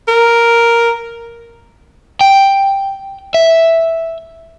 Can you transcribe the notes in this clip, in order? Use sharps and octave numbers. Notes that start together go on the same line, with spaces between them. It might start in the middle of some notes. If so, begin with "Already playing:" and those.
A#4
G5
E5